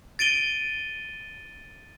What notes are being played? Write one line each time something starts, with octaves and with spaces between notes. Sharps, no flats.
A6 D7 D#7 G7